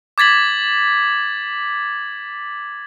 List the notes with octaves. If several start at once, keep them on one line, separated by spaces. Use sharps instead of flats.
D6 G#6 A6 B6 F#7